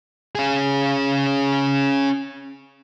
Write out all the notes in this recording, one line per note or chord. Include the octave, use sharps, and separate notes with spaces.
C#4 G#4